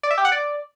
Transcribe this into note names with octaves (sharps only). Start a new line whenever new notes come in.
D5
E5
G4
F#5
D5